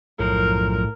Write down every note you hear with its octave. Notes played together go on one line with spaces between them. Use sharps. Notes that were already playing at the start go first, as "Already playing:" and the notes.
B1 F#2 A2 F3 A#4